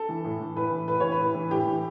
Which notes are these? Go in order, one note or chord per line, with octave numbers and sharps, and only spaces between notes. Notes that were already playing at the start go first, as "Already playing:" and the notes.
Already playing: A4
E3
A2
E3
A2 B4
E3
A2 B4
E3 C#5
B4
A2
E3
A2 G4
E3